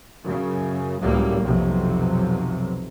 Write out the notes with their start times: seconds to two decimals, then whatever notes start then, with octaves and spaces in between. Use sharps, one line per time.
0.24 F#2 C#3
1.01 C#2 A2 F#3 G3 A#3
1.43 B1 F2 C3 F#3